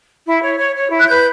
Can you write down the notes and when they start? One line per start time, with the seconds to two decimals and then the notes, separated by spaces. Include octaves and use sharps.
0.25 E4
0.41 C#5
0.58 C#5
0.74 C#5
0.90 E4
0.98 F#6
1.08 B4 G6